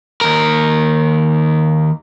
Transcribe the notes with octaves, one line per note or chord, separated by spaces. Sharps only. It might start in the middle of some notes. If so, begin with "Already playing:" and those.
D#2 A#4